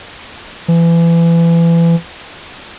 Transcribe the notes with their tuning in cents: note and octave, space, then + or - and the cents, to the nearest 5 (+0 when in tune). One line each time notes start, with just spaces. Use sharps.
E3 +30